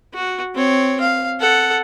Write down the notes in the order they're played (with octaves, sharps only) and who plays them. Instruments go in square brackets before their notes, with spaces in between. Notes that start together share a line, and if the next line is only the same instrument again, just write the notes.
[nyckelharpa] F#4
C4 C#5
F5
A4 F#5